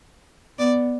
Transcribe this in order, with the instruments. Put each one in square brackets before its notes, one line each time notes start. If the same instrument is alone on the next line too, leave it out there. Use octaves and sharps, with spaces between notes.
[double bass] B3 [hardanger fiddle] D5